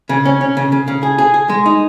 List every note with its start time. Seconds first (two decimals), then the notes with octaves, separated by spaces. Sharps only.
0.09 C#3
0.25 C#4
0.41 C#4
0.57 C#3
0.72 C#3
0.88 C#3
1.03 G#4
1.18 G#4
1.34 G#4
1.49 G#3
1.66 D#4